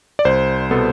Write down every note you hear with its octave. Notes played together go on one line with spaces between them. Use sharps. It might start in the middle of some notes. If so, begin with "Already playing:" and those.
D5
C2 C5
B2 B3 A4